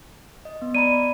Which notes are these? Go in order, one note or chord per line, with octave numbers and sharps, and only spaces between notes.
D#5
B3
D5 A#5 B5 D#7